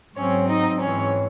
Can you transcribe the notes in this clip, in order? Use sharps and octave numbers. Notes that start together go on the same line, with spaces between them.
G#2 F#3 C4 C#4 C#5
D#4 D#5
G#2 E3 C4 C#4 C#5